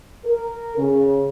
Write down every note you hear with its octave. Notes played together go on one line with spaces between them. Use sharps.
A#4
C#3